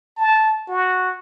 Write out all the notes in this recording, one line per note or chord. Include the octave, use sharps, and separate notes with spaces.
A5
F#4